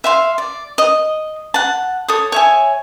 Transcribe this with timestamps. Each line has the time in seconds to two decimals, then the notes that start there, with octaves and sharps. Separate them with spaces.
0.04 E5 F5 C6
0.38 D5
0.78 D#5
1.54 F#5 A5
2.08 A4 C#5 D#6
2.32 C#5 E5 G#5